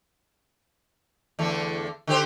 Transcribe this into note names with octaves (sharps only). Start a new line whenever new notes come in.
E2 D3 A3
D3 G4 C5